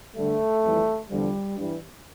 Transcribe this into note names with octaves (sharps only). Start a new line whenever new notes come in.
G2 D3 G3 A3
F2 E3 G3
E2 D3 F3 G3
G2 E3 G3